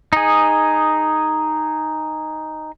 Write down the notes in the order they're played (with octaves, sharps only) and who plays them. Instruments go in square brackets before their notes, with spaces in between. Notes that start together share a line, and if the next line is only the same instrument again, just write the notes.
[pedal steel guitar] D#4 G#4